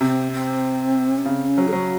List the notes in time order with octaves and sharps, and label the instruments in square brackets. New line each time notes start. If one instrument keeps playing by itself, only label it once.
[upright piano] C3 [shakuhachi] C4
[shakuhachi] C4
C#4
[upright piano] C#3 [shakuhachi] C4
[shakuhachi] C#4
[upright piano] F#3
[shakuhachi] A4
[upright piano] F#3 [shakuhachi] F#4